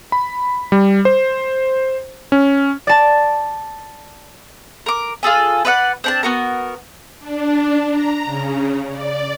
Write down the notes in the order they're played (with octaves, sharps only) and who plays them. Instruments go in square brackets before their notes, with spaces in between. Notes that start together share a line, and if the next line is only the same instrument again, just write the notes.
[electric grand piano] B5
G3
C5
C#4
[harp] D5 A5
[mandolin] A#4 D6
F4 G#4 A4 G#5
B4 D5 E5 F#5
C4 D4 A5
B3 F#4 A#4
[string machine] D4
A#5
C#3
D5